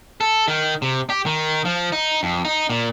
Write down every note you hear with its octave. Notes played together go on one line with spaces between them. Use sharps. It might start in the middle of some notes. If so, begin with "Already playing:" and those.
A4
D#3
C3
G4
D#3
F3
D#4
F2
D#4
A#2